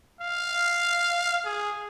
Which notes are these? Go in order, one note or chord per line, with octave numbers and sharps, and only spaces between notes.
F5
G#4